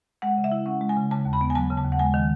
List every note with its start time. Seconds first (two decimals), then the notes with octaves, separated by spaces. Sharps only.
0.22 G#3 F#5
0.38 C#3
0.44 E5
0.52 E4
0.66 C#4 F#5
0.81 G#3
0.89 G#5
0.97 C#3
1.11 C#3 A5
1.25 D#2
1.33 B5
1.41 B3
1.50 G#5
1.55 F#3 A5
1.70 C#3
1.77 A5
1.85 D#2
1.92 F#5
1.99 G#3 G#5
2.14 D#3